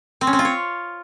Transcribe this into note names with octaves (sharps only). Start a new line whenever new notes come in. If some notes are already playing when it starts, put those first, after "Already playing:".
C4
C#4
C4
F4
C#5